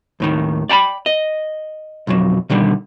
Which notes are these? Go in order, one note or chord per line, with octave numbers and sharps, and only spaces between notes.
D#2 A2 D#3
D5 G5 A5 B5
D#5
B1 F2 F#3
B2 D3 D#3 G3